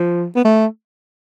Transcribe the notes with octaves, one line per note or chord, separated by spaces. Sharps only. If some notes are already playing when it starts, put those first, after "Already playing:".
Already playing: F3
B3
A3